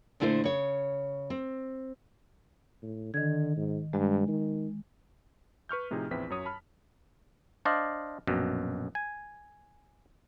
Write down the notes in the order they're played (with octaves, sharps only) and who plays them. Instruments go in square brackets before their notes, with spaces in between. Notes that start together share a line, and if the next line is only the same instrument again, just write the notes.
[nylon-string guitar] A#2 D3 A3 E4 A#4 C5
C#3 C#5
C4
[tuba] A2
[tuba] D3 [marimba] D#3 G#6
[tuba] G#2
[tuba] G2 [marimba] G#3
[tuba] D#3
[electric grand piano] B4 C#6 F6 G6
A2 C3 F3 D#4 G#4
A#1 E2 C4 E4 B4 B6
F#2 F#3 C#5 D#6
A5 B5 F6
[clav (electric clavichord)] D4 C5 D5 D#5 F5
A#1 F#2 B2
G#5